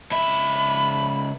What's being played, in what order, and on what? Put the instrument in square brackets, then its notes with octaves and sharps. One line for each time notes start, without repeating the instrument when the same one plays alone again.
[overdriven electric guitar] C#2 E5 [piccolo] B5